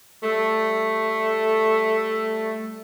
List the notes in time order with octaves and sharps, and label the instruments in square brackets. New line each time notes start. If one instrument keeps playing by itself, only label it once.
[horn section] G3 A3